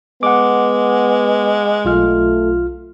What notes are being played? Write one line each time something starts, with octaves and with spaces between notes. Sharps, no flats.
G#3 B3 F#5 D6
B1 A3 F4 F6